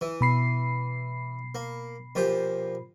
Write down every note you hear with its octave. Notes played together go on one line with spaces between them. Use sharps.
E3
B2 B5 C7
A#3
A#2 F3 G4